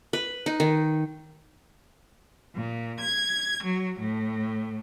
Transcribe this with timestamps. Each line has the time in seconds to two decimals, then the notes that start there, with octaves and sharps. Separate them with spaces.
0.13 B4
0.46 D#4
0.60 D#3
2.54 A#2
2.99 G#6
3.63 F#3
3.99 A2